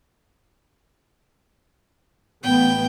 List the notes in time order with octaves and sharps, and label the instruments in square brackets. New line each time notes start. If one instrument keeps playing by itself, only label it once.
[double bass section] A1 B3 [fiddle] G5